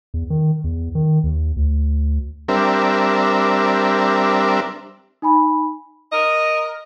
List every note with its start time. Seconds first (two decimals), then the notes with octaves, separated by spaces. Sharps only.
0.14 E2
0.30 D#3
0.64 E2
0.95 D#3
1.24 D#2
1.57 D2
2.48 G3 C4 D4 A#4 E5
5.22 D#4 G#5 B5
6.12 A#4 D#5